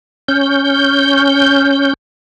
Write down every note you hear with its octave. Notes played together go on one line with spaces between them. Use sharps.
C#4 G6